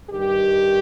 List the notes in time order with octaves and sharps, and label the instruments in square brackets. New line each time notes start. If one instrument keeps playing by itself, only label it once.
[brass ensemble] G2 D#3 G4